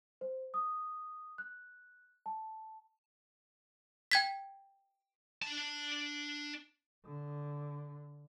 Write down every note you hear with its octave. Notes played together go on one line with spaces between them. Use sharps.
C5
D#6
F#6
A5
G5 G#6 B6
D4 A5
D3